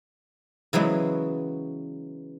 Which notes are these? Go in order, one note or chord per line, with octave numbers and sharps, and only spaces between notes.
C#3 E3 F#3 G#3 B3